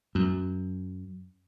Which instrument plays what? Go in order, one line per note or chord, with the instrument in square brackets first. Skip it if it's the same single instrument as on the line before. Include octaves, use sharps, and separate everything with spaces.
[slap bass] F#2